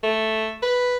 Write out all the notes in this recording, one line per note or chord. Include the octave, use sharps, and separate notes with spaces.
A3
B4